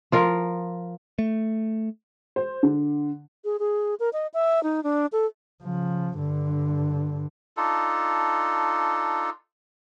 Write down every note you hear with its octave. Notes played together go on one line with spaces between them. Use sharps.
F3 F4 A#4
A3
C5
D3
G#4
G#4
A#4
D#5
E5
D#4
D4
A4
C#3 F3
G2 D3
D4 D#4 F4 A4